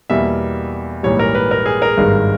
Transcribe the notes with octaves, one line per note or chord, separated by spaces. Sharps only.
E2 B2 G3 A#3 E5
A#1 G#2 E3 G3 C#5
A#4
B4
A#4
G#4
A#4
G#1 G2 D#3 G#3